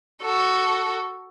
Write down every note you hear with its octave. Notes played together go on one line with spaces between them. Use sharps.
F#4 A4